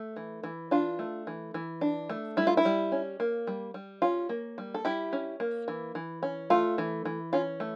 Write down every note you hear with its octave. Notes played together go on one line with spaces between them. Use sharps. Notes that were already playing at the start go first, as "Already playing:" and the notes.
Already playing: A3
E3
E3
D4 F4
A3
E3
E3
D4
A3
G3 E4
F4
E4
G3
C#4
A#3
G3
G3
C#4 F4
A#3
G3
A4
G3 E4 G4
C#4
A#3
E3
E3
C#4
A3 F4
E3
E3
C#4 F4
A3